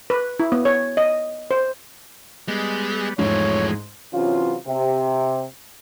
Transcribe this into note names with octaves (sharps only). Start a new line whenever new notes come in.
B4
E4
B3
C#5
D#5
C5
G3 G#3 B3
E2 G#2 F3 G#3 A3 C#5
C3 E3 F#3 C#4 F4
C3